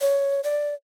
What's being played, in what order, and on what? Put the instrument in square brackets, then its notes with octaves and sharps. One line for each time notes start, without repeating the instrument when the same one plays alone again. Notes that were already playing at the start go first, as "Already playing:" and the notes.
[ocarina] C#5
D5